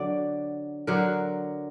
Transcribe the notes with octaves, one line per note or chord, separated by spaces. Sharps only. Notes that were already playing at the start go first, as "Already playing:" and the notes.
Already playing: D3 F#3 D5
D3 F#3 A#4